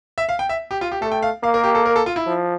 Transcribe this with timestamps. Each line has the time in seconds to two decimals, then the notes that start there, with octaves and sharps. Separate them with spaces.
0.18 E5
0.29 F5
0.39 G5
0.49 E5
0.71 G4
0.81 F4
0.92 G4
1.01 A3 A4
1.12 G5
1.22 F5
1.43 A#3 F5
1.54 A#4
1.64 G4
1.75 A4
1.86 A#4
1.96 A4
2.06 F4
2.16 E4
2.26 F3